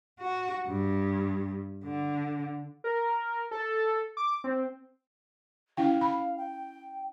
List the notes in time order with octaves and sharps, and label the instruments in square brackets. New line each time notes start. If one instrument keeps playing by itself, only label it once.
[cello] F#4
G2
D3
[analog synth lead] A#4
A4
D6
C4
[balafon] C#4 E4 G5 [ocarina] F5
[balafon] B5
[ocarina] G5